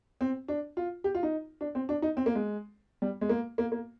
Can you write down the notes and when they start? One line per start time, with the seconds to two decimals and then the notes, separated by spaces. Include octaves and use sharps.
0.21 C4
0.48 D4
0.77 F4
1.04 G4
1.15 F4
1.23 D#4
1.61 D4
1.75 C4
1.89 D4
2.02 D#4
2.17 C4
2.26 A#3
2.35 G#3
3.02 G3
3.21 G#3
3.29 A#3
3.58 A#3
3.72 A#3